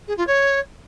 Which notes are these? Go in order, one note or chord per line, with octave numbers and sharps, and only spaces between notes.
G#4
F4
C#5